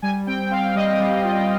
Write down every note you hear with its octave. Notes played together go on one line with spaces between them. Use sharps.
G3 G#5
C4 G5
C4 F5
G3 D#5
G3
F4